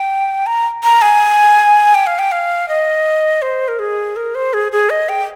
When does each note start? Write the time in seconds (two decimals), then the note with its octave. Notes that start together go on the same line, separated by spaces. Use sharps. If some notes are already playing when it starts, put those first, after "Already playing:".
Already playing: G5
0.46 A#5
0.84 A#5
1.02 G#5
1.94 G5
2.07 F5
2.19 G5
2.32 F5
2.69 D#5
3.42 C5
3.68 A#4
3.79 G#4
4.16 A#4
4.35 C5
4.54 G#4
4.72 G#4
4.90 D#5
5.09 G5